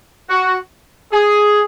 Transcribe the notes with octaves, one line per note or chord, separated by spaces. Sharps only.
F#4
G#4